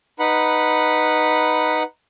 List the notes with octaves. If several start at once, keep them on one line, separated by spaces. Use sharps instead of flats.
D#4 B4 F#5 B5